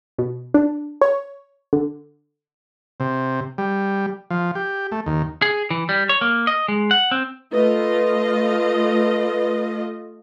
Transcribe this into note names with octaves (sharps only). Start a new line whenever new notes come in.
B2
D4
C#5
D3
C3
G3
F3
G4
A3
D#2
G#4
E3
G3
C#5
A#3
D#5
G#3
F#5
C4
A3 F4 B4 D#5